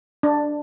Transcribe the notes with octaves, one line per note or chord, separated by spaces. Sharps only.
D4